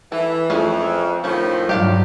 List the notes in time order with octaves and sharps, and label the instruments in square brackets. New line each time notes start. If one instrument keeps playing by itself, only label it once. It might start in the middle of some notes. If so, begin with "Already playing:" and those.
[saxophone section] E3 [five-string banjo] A4
[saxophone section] F2 [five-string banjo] A3 C#4 G#4
[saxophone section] A2 D#3 F3 [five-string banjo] C#4 C#5
[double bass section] G2 F#3 [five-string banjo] D4 F4 G4